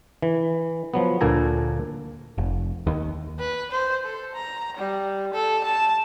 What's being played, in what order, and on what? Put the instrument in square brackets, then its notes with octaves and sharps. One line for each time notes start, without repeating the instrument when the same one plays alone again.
[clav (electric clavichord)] E3
F3 F#3 B3
D2 A#2 A#3 A4 G#5 A#5
[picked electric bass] F1
D#2
[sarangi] B4
C5
A4
A#5
G3
A4
A5